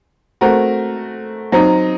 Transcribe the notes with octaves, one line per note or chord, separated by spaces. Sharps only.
A3 C4 F#4 A#4
F#3 C4 D#4